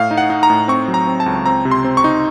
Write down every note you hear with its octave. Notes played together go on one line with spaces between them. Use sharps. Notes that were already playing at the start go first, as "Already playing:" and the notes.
Already playing: A2 F5
D#4
F#5
D#4
A#5
A2
C4 C#6
F#3
A#5
C4
A5
C#2
C4 A#5
C3
C6
C4
C#6
D#4